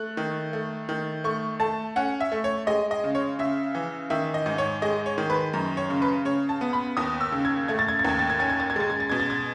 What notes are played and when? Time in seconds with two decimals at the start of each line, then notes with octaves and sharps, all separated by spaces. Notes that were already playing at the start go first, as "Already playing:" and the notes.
Already playing: A3 F#6
0.17 D#3
0.53 A3
0.89 D#3
1.24 A3 C#6
1.60 A3 A5
1.96 C#4 F#5
2.20 E5
2.32 A3
2.44 C#5
2.67 G#3 D#5
2.91 D#5
3.04 C#3
3.15 C#5
3.39 C#3 E5
3.75 E3
4.10 D#3 E5
4.34 D#5
4.46 G#2
4.58 C#5
4.82 G#3 D#5
5.06 C#5
5.18 D#3
5.30 B4
5.53 F#2
5.77 C#5
5.90 C#3
6.02 B4
6.25 C#3 C#5
6.49 A5
6.61 B3
6.73 B5
6.97 D#2 D#6
7.21 E6
7.32 C#3
7.45 G#6
7.68 A3 G#6
7.79 A6
7.89 G#6
7.99 A6
8.05 D#2 G#6
8.19 A6
8.30 G#6
8.39 C#4 A6
8.50 G#6
8.60 A6
8.70 G#6
8.76 G#3 A6
8.90 G#6
9.00 A6
9.10 B2 G#6
9.20 A6
9.30 G#6